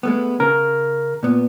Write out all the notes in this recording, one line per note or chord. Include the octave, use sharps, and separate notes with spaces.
G#3 A3 B3
C#3 A#4
A#2 B3